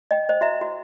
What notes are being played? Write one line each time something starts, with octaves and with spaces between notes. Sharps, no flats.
D#5 G5
C5 D#5
F#4 E5 A#5
F#4